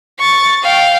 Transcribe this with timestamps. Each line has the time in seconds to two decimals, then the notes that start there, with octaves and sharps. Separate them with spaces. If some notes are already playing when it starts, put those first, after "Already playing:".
0.19 C#6 A6
0.63 F5 G5